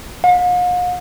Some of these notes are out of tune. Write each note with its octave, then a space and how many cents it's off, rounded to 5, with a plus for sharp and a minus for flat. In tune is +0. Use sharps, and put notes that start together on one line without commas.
F5 +45